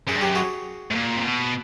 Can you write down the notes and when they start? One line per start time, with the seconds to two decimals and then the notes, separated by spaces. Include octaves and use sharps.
0.08 F#2 G#4
0.16 G2
0.21 F#2 G4
0.35 F#4 G#4
0.91 A2
0.95 A#2
1.16 C3
1.24 B2